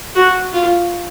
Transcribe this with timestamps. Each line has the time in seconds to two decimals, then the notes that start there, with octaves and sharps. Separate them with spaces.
0.15 F#4
0.53 F4